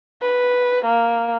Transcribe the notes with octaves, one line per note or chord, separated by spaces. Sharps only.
B4
A#3